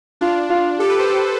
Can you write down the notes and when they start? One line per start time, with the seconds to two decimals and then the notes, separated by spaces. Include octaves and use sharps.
0.21 D4 F4
0.50 F4
0.79 G4 A4
0.90 B4
0.99 C5